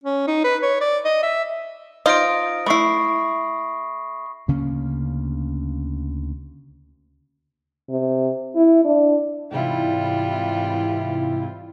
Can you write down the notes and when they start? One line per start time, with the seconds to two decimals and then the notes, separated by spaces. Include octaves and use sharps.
0.03 C#4
0.27 D#4
0.44 B4
0.62 C#5
0.81 D5
1.05 D#5
1.23 E5
2.06 D#4 F4 C5 D#6 A#6 D7
2.66 A3 E4 B5 C#6 C7
4.48 D2 C#3 A#3 C#4
7.89 C3
8.55 E4
8.85 D4
9.51 G#2 C3 E3 G3 E4 F4